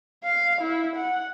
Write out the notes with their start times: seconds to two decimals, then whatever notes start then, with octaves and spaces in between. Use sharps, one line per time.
0.24 F5
0.61 E4
0.96 F#5